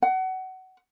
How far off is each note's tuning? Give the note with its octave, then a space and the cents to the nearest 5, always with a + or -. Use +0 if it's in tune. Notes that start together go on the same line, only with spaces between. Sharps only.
F#5 +25